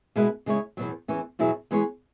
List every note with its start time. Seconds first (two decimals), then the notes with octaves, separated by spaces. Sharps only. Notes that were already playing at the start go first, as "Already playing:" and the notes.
0.16 B2 G#3 E4 B4
0.46 C#3 G#3 E4 C#5
0.77 E2 B2 F#3
1.08 E2 E3 C#4
1.39 E2 B2 F#3 E4 G#4
1.71 E3 G#3 B3 G#4 C#5